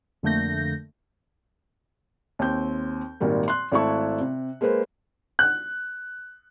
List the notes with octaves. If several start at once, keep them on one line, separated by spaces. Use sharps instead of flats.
F2 D3 A3 A#3 G6 A#6
D#2 C4 G6
G#1 A#2 D#3 G3 A#3
C6 F#6
G#1 A3 E4 A5 C#6
C3
G#3 A#3 G#4 B4 C5
F#6